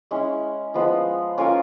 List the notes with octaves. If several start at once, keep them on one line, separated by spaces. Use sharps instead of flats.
G#3 C#4 E4
F3 G#3 B3
C#4 F4 A#4